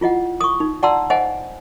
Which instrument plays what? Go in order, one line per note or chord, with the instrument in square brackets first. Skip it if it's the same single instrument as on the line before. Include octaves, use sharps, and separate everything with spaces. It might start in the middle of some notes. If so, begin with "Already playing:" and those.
[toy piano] E4 F4 D#5 F#5
C#6 D#6
D#4
D5 F#5 A5 A#5 C6 E6
C5 D#5 F5 F#5 G#5